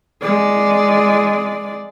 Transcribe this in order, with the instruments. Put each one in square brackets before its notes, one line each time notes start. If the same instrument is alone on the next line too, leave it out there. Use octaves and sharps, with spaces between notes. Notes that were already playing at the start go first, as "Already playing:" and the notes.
[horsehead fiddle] G#3 D5